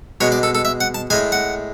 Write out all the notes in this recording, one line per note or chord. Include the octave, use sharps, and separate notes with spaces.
B2 G#3 C#5
D5
A4
A4
E5
F#5
A5
A2 G#3 G#5
F#5